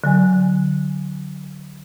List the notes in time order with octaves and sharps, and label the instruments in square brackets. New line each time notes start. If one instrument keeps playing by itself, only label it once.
[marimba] D3 F#3 G#5